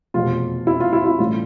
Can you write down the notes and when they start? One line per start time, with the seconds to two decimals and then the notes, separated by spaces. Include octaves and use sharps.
0.14 F1 E2 B2 F4
0.67 E4
0.80 F4
0.93 E4
1.01 F4
1.05 E4
1.19 A1 A2 G3 F4